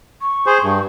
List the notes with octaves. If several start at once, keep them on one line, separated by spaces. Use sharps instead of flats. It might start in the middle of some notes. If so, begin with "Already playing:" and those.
C#6
G#4 C5
G2